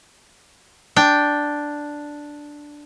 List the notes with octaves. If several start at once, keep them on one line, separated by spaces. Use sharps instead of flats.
D4 G5